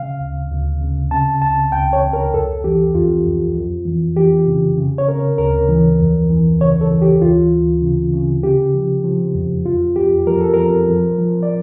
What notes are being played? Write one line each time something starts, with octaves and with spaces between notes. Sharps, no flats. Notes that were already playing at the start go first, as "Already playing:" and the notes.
Already playing: C#3 F5
D2
D2
C#3
C#3 A5
C#2 A5
C#2 G5
C#5
C#2
A#4
F2 A4
E3 G4
F2 F4
F2
F2
E3
E3 G4
C#3
C#3
C#5
C#3 A#4
D2 A#4
E3
F2
E3
C#3 C#5
A4
E3
G4
D2 F4
D2
C#3
C#3
C#3 G4
F3
F3
F2
F2 F4
F2 G4
F3 A#4
A4
F3 A#4
F3
F3
D5